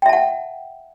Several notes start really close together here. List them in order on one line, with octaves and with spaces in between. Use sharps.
G5 E5 A5 F#5